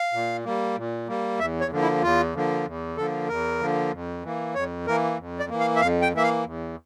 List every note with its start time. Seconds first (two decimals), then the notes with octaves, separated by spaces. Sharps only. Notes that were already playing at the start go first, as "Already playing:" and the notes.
Already playing: F5
0.13 A#2
0.44 G3 A#3
0.76 A#2
1.08 G3 A#3
1.39 E2 E5
1.61 C#5
1.71 D3 F3 A#3
1.82 E4
2.02 E2 F4
2.35 D3 F3 A#3
2.66 E2
2.97 D3 F3 A#3 A4
3.28 E2 A#4
3.60 D3 F3 A#3
3.92 F2
4.23 E3 A#3
4.55 F2 C#5
4.86 E3 A#3 A#4
5.18 F2
5.39 D5
5.50 E3 A#3
5.60 F5
5.76 E5
5.81 F2 F5
6.02 G5
6.13 E3 A#3 E5
6.23 F5
6.44 E2